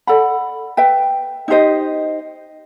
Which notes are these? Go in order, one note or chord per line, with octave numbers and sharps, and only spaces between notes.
A4 D5 F#5 B5
B4 E5 G5
D#4 G4 C5 D#5